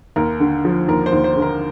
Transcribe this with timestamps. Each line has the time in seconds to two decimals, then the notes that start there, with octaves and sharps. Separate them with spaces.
0.16 D#2 A#4
0.40 D3
0.65 F3
0.88 D#2 A#4
1.06 C5
1.12 D#2
1.24 C5
1.36 D3
1.42 A#4